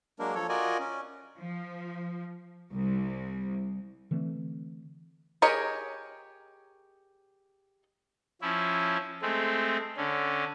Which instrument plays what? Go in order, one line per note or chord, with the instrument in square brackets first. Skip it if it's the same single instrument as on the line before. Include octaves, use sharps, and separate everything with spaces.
[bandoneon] F#3 G#3 A#3 D4 A#4
F3 A4 C#5
F4 F#4 A#4 D5 D#5 G#5
C#4
[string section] F3
C2
[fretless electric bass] D3 E3 A3 C4
[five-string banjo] G4 G#4 A#4 C#5 D#5
[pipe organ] F3 C#4 E4
G#3 A3 C4
D3 C#4